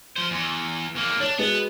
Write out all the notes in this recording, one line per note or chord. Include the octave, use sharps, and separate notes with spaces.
F3 C5
E2
E2 A#3
D4 C#5
G#3 B3 F#4 B4